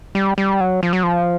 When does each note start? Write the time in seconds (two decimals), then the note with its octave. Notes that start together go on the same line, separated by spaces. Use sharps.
0.15 G3
0.38 G3
0.60 F#3
0.83 F3
0.93 F#3
1.03 F3